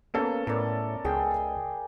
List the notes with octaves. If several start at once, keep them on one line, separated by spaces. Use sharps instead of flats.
A#3 B3 C#4 A4
A2 A#4 D5
C#2 G#4 G5